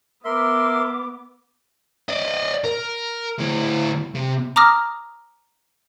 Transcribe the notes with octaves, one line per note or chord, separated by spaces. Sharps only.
B3 A#4 E5 C6 D6
D5 D#5
A#4
D2 E4
C3
A#5 D6 D#6 F6 A#6